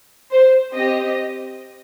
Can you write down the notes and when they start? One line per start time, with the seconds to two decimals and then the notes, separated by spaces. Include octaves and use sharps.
0.31 C5
0.73 C4 G4 D#5